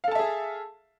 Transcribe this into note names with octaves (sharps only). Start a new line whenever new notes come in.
G#4 A4 E5 F5 A5